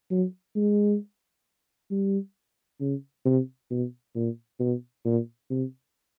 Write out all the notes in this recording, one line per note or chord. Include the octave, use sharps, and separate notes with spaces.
F#3
G#3
G3
C#3
C3
B2
A#2
B2
A#2
C3